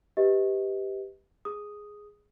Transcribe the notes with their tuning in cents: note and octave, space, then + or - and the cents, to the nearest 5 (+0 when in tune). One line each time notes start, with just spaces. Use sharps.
G4 +0 B4 +0 D#5 +30
G#4 +0 D#6 +0